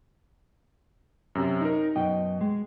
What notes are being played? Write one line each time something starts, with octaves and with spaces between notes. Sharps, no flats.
F#2 C3
D#4 A#4
F#2 B2 D#5 G5
G#3